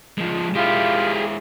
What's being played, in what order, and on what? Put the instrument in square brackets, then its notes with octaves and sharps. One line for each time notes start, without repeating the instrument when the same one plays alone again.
[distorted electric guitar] F3 G#3
[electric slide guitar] G#3 E4 [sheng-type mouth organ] F4 [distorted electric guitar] G4 G#4